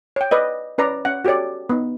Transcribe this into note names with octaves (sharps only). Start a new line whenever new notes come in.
C#5 G5
B4 D5 D#5
C#4 B4 D5 A#5
C#4 F#5
F#4 G4 A4 C#5 D5
B3 D#4